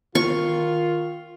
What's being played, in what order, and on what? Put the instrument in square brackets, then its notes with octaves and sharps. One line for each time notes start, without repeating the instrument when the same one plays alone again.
[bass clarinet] D#3 [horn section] F4 [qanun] C#6